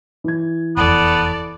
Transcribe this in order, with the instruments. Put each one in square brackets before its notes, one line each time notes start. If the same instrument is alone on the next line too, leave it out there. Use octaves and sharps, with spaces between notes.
[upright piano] E3 G#6
[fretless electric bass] F1 E2 [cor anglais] B3 [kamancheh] A4 D5